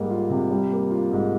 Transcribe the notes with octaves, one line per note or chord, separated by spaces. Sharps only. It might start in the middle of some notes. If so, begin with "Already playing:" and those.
Already playing: G#2 G3 A#3
F4
C3
G3
A#3
F4
G#2